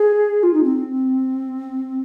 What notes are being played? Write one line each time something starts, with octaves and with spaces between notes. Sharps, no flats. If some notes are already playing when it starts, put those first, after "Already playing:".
Already playing: G#4
F4
D#4
C4